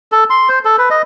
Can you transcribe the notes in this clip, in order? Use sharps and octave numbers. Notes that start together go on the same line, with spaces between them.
A4
C6
C5
A4
B4
D#5